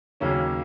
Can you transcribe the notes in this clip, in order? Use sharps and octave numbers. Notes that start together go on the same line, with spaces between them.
D#2 C#3 F#3 A#3 C#4